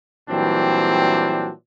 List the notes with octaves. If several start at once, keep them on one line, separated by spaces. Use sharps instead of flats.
A#2 E3 F#3 G3 C4 D4